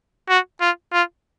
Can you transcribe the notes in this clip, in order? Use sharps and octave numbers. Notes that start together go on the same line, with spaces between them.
F#4
F4
F4